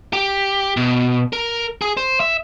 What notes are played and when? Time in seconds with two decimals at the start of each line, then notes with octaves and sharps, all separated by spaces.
0.13 G4
0.77 B2
1.33 A#4
1.81 G#4
1.97 C5
2.20 E5